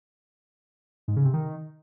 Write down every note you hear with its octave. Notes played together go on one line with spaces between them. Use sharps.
G#2
C#3
C3
D#3